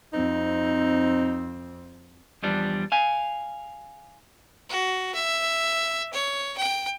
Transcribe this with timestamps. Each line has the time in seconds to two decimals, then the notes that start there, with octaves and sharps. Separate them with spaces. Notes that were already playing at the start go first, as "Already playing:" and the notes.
0.13 F2 C4 D#4
2.43 E2 F3 G3 D4
2.92 F5 G#5
4.70 F#4
5.15 E5
6.13 C#5
6.57 G5